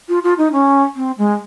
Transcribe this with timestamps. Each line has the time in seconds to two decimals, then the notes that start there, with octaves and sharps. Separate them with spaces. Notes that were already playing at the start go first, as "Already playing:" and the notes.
0.09 F4
0.24 F4
0.38 D#4
0.53 C#4
0.96 C4
1.18 G#3